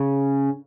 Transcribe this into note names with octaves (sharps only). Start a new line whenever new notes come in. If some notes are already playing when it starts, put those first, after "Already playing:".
Already playing: C#3